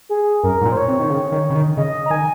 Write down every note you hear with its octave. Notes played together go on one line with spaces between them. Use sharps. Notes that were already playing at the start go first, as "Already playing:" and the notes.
G#4
F#2 A#4
G#2
A#2
C5
C#5
C3
D#3
C#3
D#3
C#3
D#3
C#3 D#5
A#5
D#3 G#5